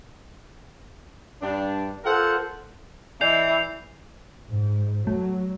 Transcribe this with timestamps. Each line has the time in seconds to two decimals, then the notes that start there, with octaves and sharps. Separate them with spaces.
1.42 G2 D4
2.04 F4 A4 A#4 C5 F#5
3.21 E3 D5 D#5 G#5 G6 C7 F7
4.49 G#2
5.07 F#3 A3